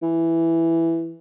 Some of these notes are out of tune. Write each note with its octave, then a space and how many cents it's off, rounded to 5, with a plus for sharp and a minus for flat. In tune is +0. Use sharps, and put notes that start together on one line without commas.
E3 +5